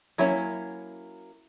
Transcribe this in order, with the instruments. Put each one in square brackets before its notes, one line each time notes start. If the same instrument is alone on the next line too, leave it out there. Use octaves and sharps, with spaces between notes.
[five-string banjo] F#3 A#3 C#4 E4